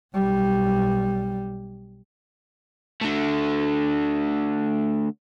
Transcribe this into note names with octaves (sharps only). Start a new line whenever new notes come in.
B1 G3
D3 A3